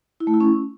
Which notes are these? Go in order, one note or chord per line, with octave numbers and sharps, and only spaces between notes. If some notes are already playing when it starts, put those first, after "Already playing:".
E4
A3
E4
C#4